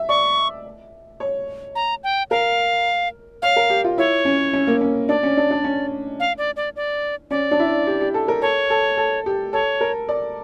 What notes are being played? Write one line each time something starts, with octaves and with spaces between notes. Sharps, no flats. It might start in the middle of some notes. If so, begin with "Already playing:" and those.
Already playing: E5
D5 C#6
C#5
A#5
G5
A#4 F5
C#5 F5
A#4
G4
F4
E4 C#5
C#4
C#4
A#3
C#4
D4 D5
C#4
D4
D4
C#4
F5
D5
D5
D5
C#4 D5
D4
E4
G4
G4
A4
A#4
A4 C#5
A4
A4
G4
A4 C#5
A#4
D5